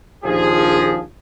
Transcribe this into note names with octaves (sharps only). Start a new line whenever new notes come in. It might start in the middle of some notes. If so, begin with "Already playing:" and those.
A#1 D#2 F3 G#4